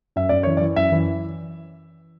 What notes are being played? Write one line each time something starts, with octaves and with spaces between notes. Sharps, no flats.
F#2 E5
F#2 D5
E3 C#5
D5
E3
F#2 E5
E3